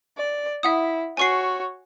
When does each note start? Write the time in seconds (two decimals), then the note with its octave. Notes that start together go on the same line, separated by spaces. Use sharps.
0.17 D5
0.63 E4 E5 F#5 D#6
1.17 F#4 C#5 G#5 C#6 C7